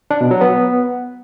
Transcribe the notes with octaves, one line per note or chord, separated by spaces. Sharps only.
D4
B2
F#3
B3